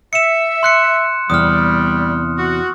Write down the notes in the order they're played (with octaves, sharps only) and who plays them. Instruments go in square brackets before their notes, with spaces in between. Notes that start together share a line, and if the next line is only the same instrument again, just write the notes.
[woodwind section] E5 [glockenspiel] C#7 E7
[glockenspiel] C6 F#6 C#7
[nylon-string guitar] E2 C3 [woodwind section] G3 [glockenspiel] D#6 F6
[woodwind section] F#4